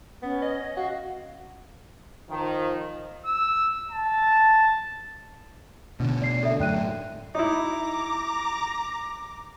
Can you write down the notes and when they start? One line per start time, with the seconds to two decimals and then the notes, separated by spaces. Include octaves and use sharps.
0.22 B3 C#4
0.42 D#5
0.77 F#4 F5
2.29 D#3 F3
3.26 E6
3.91 A5
6.00 B2 D3
6.22 D5 C7
6.43 A4 D5 E5
6.60 F#2 A2 G5 F#6 D#7
7.35 D#4 E4 A#5 D6